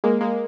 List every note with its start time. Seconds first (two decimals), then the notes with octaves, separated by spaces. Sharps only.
0.04 G#3 A#3
0.21 G#3 A#3